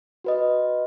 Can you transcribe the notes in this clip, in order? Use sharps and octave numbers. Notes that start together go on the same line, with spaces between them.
F#4 B4 D#5